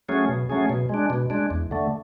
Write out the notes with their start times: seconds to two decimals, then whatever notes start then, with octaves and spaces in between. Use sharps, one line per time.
0.09 F#3 A3 C#4 G#4
0.29 B2
0.49 F#3 A3 C#4 G#4
0.70 B2
0.89 G#3 D4
1.10 B2
1.30 G#3 D4
1.50 E2
1.71 D3 A3